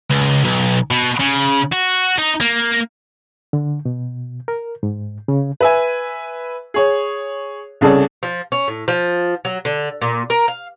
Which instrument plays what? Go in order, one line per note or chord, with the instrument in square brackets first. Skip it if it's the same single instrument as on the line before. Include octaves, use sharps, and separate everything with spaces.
[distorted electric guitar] C#2
B1
B2
C#3
F#4
D#4
A#3
[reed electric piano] D3
B2
A#4
G#2
C#3
[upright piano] B4 E5 G#5
G#4 C#5
C2 C#3 G#4 A4 C#5 D5
[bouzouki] F3
C#4
A2
F3
F#3
D3
A#2
A#4
F5